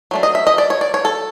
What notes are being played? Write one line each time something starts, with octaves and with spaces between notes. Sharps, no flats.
F#3 A3 D4
D#5
E5
D#5
D5
C#5
D5
C#5
A4